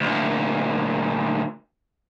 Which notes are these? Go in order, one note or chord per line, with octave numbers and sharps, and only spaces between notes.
D2 A#2